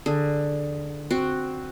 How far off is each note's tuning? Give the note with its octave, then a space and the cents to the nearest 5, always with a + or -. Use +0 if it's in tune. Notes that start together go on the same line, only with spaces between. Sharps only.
D3 +5 G#4 +0
C4 +0 F#4 +0